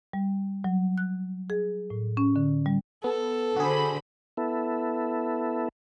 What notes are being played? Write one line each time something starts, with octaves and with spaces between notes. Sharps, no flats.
G3
F#3
F#6
G#4
A2
C#4
D3
G3
B3 A4
D3 F#4 G#4 C5 B5
B3 E4 A4